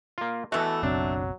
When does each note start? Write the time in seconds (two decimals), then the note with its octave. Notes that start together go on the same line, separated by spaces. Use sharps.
0.18 A#3 F4
0.52 B2 E3 A3 B3 F#4 A4
0.83 F#1 B1 F#3 C4 D4